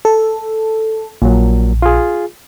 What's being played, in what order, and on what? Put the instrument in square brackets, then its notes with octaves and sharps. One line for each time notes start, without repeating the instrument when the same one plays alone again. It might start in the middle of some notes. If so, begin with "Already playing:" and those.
[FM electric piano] A4
[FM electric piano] A#1 [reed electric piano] A#2 F#3
[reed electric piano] F4 G#4